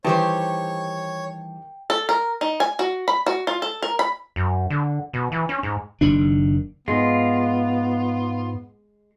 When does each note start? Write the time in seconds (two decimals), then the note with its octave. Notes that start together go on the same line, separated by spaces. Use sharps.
0.05 D#3 E3 G3 G4 C5 C#5 G5 A5
1.90 A4
2.09 A#4
2.41 D#4
2.60 G#5
2.79 F#4
3.08 B5
3.26 F#4
3.47 F4
3.62 A4
3.82 A#4
3.99 B5
4.36 F#2
4.70 D3
5.13 B2
5.32 E3
5.49 C#4
5.63 G#2
6.01 F#1 D#3 D4
6.88 G#2 G#3 B3 F4